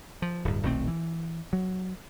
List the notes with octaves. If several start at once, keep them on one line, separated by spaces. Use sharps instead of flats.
F3
D1 G2
D#1 B1 A3 C4
E3
F#3